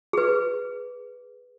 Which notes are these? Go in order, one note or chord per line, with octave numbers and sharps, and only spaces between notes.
G#4 B4